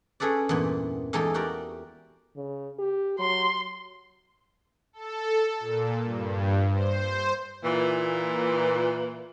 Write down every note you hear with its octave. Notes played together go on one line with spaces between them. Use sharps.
C#4 G#4 A4 B4 D5
E2 G2 A#2 B3
E2 G#3 D#4 G4 A4 G5
F#4 G4 A#4 D5
C#3
G4
F#3 C6
A4
A#2
G2
C5
A#2 E3